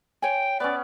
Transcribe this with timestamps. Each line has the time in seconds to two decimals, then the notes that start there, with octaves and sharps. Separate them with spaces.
0.22 C#5 G5 G#5
0.60 B3 C#4 D5